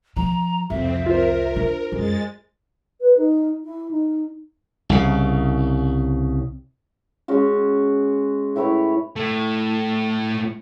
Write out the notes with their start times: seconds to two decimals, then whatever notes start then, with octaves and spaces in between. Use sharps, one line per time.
0.16 F3 A#5
0.70 C2 F2 C4 E5
1.06 F4 A#4 C5
1.56 D4
1.92 F#2 G#3 A6
3.01 B4
3.17 D#4
3.64 E4
3.91 D#4
4.89 C2 C#3
7.28 G#3 C#4 F#4
8.56 A2 E4 B4 C#5
9.16 A2 A3